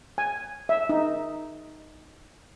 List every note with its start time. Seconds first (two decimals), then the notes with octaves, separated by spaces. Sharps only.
0.18 G#5
0.69 E5
0.89 D#4